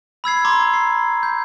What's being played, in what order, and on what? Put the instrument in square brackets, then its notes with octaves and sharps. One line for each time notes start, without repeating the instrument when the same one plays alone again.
[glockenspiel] B5 E6 G#6 C7
A#5 C6 D6
C7
G6